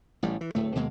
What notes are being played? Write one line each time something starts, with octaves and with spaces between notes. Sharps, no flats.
A1 A2 G3
E3
D1 A2 A3
D2 B2 G#3 A#3